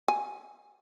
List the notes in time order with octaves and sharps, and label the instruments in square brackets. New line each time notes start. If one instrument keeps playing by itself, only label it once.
[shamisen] G#5